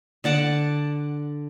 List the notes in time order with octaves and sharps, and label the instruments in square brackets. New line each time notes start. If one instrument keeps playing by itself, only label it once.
[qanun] D3 D5 F#5 A5